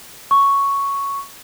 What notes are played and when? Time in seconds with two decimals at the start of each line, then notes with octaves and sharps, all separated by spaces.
0.31 C#6